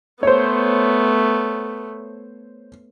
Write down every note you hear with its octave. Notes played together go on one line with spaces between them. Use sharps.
A3 B3 C5 C#5